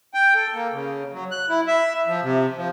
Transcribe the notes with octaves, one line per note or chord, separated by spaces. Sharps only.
G5
A4
A#3
C#3
F#3
F#6
E4
E5
F3
C3
F3